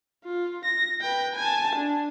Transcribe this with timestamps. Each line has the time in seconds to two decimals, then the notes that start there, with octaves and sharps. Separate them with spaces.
0.25 F4
0.65 A#6
1.01 B4 G5
1.36 G#5 A5
1.75 D4